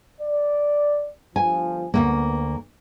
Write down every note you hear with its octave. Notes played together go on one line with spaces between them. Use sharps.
D5
G1 F3 G#5
D2 G2 A#3 B3